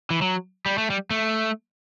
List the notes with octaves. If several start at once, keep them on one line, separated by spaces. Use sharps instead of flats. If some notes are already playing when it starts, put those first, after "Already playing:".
E3
F#3
G3
A3
G3
A3